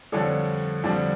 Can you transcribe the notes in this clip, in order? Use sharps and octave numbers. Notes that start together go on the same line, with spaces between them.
F2 D3 G3 D4 A4 C#5
F2 D3 G3 D4